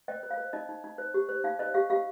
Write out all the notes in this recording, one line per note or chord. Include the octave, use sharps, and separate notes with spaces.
C5 D#5 G5
C5
F5
C5
D#4 D#5
D#4
D#4
C5
G4
C5
D#4 F5
C5 D#5
G4 F5
G4 F5